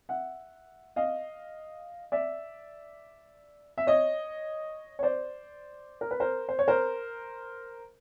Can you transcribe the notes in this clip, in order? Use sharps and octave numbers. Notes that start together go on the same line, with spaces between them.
E5 F#5
D#5 F5
D5 E5
E5
C#5 D#5
C#5
C5 D5
A#4
B4
A#4 C5
C5
C#5
A#4 C5